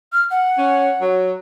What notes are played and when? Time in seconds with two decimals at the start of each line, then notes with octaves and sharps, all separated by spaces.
0.12 F6
0.31 F#5
0.58 C#4
1.01 F#3